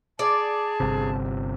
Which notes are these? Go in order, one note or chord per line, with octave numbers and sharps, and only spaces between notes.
G#4 D5 A5
G1 C3